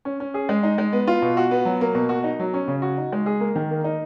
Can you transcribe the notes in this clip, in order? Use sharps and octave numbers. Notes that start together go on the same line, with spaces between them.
C#4
C#4
G#4
G#3
D#4
G#3
B3
F4
B2
F#4
B3
F#3
A#3
B2
F#4
D#4
F#3
C#4
C#3
F#4
D#4
G#3
G#4
A#3
D#3
A#3
D#4